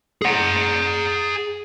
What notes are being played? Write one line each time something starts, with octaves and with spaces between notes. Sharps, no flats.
G#4 F#5